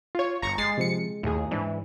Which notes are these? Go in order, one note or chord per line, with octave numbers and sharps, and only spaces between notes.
F4 C#5
G1 A#5 C#6 A#6
G#3 A6 C7
C3 F3 C#7
D#2 A2 D#3 G#4
G#2 E3 D4